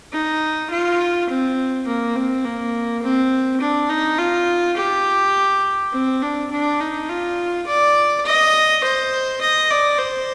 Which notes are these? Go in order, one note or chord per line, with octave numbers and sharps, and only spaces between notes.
D#4
F4
C4
A#3
C4
A#3
C4
D4
D#4
F4
G4
C4
D4
D4
D#4
F4
D5
D#5
C5
D#5
D5
C5